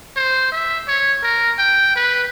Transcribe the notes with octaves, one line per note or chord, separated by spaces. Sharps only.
C5
E5
C#5
A#4
G5
B4